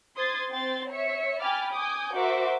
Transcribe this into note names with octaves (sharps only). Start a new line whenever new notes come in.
C5 C6 D#6 G#6 A6
C4 G5 C6 A6
C#5 E5 C#7
G5 G#5 B5 D6 F6 A6
G#5 D6 D#6 G6
F#4 A#4 C5 E5 D6